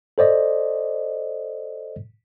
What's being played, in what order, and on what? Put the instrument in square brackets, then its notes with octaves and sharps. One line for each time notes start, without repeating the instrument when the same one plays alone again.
[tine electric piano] A4 C5 D5 D#5